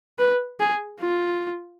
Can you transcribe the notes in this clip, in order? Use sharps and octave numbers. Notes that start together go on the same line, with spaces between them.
B4
G#4
F4